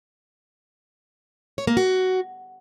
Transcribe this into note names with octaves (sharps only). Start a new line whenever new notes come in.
C#5
A#3
F#4